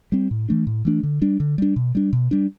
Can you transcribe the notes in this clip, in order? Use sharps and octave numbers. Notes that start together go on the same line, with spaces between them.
G3 C4
A2
E3 A3 D4
A2
E3 A3 D4
D3
G3 D4
D3
G3 D4
B2
G3 D4
B2
G3 D4